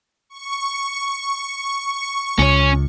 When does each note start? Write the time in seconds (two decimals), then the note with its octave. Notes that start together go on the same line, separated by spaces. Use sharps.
0.30 C#6
2.39 C#2 C#4 C#5